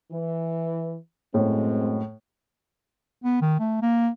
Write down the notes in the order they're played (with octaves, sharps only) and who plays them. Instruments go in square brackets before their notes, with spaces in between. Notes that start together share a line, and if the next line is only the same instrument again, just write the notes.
[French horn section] E3
[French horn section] F#2 G#3 C4 [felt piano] A2
[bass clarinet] B3
D#3
A3
A#3